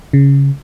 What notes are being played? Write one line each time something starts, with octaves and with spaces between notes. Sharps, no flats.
C#3